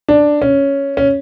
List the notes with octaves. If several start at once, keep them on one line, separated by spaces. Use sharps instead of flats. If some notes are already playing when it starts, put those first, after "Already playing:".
D4
C#4
C#4